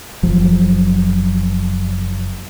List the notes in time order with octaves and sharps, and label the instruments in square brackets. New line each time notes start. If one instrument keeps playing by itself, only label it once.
[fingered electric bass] F#1 F3 F#3